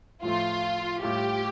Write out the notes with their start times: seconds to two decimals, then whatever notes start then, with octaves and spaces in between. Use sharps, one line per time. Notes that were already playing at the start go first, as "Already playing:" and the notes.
0.23 A2 F3 A3 F4
1.02 A2 G3 F4 G4